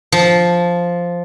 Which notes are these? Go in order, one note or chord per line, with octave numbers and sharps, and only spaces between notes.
F3